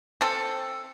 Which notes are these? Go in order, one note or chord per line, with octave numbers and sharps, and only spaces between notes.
C4 A4